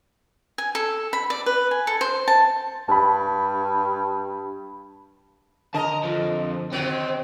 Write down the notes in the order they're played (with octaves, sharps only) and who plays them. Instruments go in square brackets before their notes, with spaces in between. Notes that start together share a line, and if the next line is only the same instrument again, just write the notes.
[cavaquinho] G#5
A4
B5
D5
B4
G#5
A4
C5
A5
[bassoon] G2 [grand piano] A5 B5
[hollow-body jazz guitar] D3 [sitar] A#4 D#5 [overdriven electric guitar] A5 A#5
[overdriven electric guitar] F2 F3
[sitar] C3 D#3 F#3 [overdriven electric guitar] C4